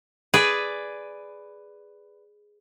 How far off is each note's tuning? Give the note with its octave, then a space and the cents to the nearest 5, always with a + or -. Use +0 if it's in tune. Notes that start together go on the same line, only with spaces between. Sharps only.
G#4 +0 B4 +10 D5 +0